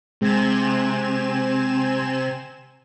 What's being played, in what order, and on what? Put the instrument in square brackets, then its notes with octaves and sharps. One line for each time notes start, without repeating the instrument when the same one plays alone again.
[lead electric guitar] C3 [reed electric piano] G#3 [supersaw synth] C4 G#5 E7